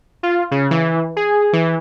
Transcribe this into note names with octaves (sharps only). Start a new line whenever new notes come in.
F4
C#3
E3
G#4
E3